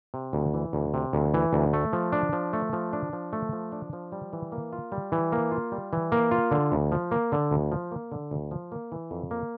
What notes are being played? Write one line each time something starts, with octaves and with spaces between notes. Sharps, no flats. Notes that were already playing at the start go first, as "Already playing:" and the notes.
C3
D2
E3
D2
C3
D2
E3
D2
A3
F3
D4
F3
A3
F3
D4
F3
A3
F3
D4
F3
G3
E3
A#3
F4
G3
E3
A#3
F4
G3
E3
A#3
F4
D3
D2
F3
A#3
D3
D2
F3
A#3
D3
D2
F3
A#3
E3
F2
A#3